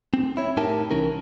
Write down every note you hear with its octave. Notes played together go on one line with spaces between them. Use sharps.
C4
E4 C#5
A2 D#4 E4 G4 A#4 A5
C2 E3 C#4 A#4